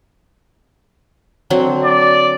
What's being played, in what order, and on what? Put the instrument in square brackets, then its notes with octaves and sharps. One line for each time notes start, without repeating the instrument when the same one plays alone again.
[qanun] D3 F#3 C4
[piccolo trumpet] D5